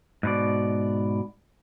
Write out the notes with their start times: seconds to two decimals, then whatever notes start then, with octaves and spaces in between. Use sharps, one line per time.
0.23 G#2 B2 D5